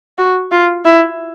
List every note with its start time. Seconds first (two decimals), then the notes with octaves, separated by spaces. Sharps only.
0.18 F#4
0.51 F4
0.85 E4